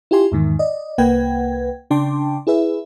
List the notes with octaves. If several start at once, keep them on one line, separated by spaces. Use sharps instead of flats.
E4 F4 G4 G#5 C6
E2 G#2 D#3
D5 D#5
C2 A#3 B4 F#5 G5 G#6
C#3 D4 G5 A5 C6 D6
E4 G#4 B4 E5